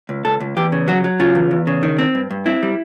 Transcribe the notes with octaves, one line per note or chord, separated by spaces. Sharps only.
C#2
C#2 A4
C#2
E2 G4
C#3
F#3 F#4
F#3
C#3 F4
E2
E2
C#3
D#3
C4
G2
G2
C4 E4
G3